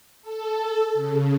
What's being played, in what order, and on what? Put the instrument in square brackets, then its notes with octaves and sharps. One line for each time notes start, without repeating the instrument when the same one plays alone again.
[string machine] A4
C#3